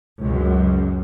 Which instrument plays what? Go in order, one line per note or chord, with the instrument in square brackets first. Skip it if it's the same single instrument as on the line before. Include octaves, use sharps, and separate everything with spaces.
[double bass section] C#2 F#2